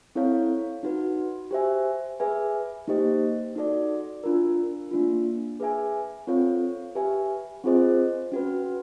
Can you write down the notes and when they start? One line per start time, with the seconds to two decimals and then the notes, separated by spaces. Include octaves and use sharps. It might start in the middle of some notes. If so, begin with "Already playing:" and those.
0.15 C4 E4 A4 C#5 F5
0.83 D#4 F#4 B4
1.51 G4 C5 E5 G#5
2.20 G#4 B4 E5 G#5
2.88 A#3 D#4 G4 C5 D#5
3.55 D#4 F#4 A4 D5
4.24 D4 F4 A#4
4.91 A#3 D4 F4
5.60 G#4 B4 E5 G#5
6.27 C4 F4 A4 C#5 F5
6.95 G4 B4 E5 G#5
7.64 C4 F4 G#4 C5 D#5
8.32 C#4 F#4 B4